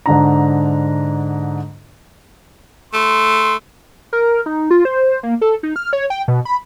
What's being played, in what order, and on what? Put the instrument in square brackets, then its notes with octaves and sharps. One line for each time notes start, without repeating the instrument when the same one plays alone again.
[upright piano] G#2 D3 D4 A#5
[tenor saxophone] A3 [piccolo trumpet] C6
[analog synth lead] A#4
D#4
F4
C5
A#3
A4
D#4
F6
C#5
G5
B2
B5